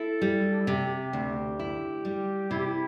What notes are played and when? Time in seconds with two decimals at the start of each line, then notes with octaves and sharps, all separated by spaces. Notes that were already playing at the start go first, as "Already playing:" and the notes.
Already playing: E4 A4
0.22 G3
0.52 D4
0.59 E4
0.67 C3 G4
1.13 D2
1.59 E4
2.05 G3
2.51 C3 E4
2.59 G4
2.66 E4